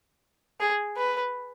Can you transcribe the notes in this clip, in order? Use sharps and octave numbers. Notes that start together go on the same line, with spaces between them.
G#4
B4